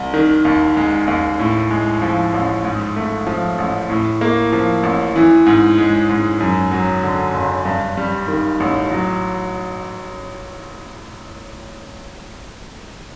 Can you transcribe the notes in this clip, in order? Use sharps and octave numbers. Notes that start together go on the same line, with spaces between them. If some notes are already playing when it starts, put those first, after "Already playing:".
Already playing: C2
D#3
D#2
G#3
D#2
A2
G#3
F3
A1
G#2
A3
F3
A1
A2
A#3
F3
A1
E3
G#2
G#3
G#2
F#2
F#3
D3
F#1
G2
G3
D#3
A1
F#3